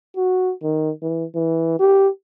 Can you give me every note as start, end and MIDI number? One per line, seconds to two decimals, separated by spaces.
0.17 0.53 66
0.63 0.91 51
1.02 1.25 52
1.35 1.79 52
1.79 2.08 67